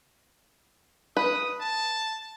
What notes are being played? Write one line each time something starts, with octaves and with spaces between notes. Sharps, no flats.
B4 D#6
A5